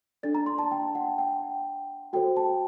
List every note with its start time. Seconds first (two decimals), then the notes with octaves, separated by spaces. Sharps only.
0.23 D4 A4 D5 A6
0.35 A#5
0.46 C6
0.59 A5
0.71 G5
0.95 F#5
1.18 G5
2.13 F#4 A4 C5 G5
2.37 A5